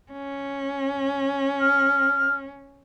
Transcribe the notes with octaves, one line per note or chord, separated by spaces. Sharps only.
C#4
F6